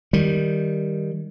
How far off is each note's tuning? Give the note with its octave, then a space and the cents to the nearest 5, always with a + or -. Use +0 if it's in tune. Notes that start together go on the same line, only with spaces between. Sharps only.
D#3 +0 G3 +0